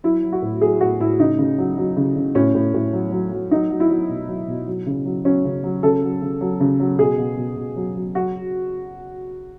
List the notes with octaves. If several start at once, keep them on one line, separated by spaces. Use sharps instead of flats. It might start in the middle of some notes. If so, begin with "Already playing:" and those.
F#3 E4
F#3
F#4
A2
F#3 G#4
A2 F#4
A2 E4
C#3 D#4
C#3
F#3
F#3
C#3
C#3
A2 C#4
A2
A2
F#3
F#3
F#3
F#3 D#4
F#3
E4
F#3
B2
F#3
B2
F#3
C#3
F#3
F#3 C#4
C#3
F#3
C#3 A4
F#3
C#3
F#3
C#3
F#3
B2 G#4
B2
B2
B2
F#3
F#3
F#3 F#4